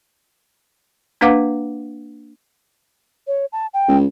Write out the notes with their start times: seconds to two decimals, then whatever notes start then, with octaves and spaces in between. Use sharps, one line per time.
1.21 A#3 D4 B4 F5 F#5 D6
3.27 C#5
3.52 A5
3.74 G5
3.88 C#2